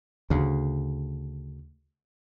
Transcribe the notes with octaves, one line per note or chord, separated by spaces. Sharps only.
D2 C#3